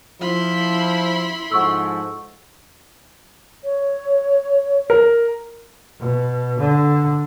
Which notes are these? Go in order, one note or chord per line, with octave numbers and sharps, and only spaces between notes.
F3 E4 B5 C6
G#2 F3 A4 F#5 C#6 E6
C#5
A#4
B2
D3